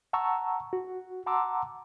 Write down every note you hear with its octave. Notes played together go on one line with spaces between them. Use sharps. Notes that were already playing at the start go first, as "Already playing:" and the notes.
F#5 A5 A#5 C#6 E6
F#4
F#5 A5 A#5 C6 D6 E6